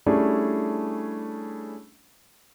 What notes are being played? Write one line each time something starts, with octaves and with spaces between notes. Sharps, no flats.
G3 A3 C#4 D4 E4 G#4